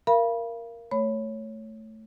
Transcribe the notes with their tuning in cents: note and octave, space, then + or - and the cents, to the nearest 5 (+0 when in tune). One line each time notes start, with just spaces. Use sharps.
A#4 +0 F5 -30 B5 -25
A3 +0 C#5 +0 B5 +5